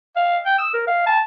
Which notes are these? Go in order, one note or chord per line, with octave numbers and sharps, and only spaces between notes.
F5
G5
E6
A#4
F5
A5